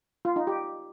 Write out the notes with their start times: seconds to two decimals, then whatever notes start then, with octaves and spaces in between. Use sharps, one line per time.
0.25 F4
0.36 D#4
0.47 G4